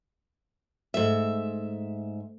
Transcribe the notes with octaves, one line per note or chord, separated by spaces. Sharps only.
G#2 A3 A4 E5